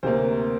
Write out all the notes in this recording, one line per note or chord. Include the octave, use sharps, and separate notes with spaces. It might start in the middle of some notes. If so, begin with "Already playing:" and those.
D2 C3 A#3 C5